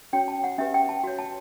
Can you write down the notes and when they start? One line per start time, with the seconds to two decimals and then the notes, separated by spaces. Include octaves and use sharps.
0.13 C#4 F#4 C#5 G5
0.28 A5
0.44 F#5
0.58 C#4 G4 B4 E5
0.74 G5
0.89 A5
1.04 F#4 C#5
1.19 A5